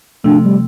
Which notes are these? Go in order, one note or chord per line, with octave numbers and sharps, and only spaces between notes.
C3 F3 A3 D4
G3